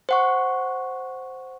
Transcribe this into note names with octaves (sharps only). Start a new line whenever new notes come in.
C5 F#5 C#6